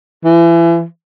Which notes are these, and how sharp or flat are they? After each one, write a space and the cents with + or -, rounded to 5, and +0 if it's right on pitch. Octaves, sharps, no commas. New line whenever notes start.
E3 +35